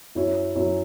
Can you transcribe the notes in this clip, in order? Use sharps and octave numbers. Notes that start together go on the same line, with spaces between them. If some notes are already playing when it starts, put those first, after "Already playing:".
F#2 F#3 C#4 E4 C#5
F#2 F#3 C#4 E4 C#5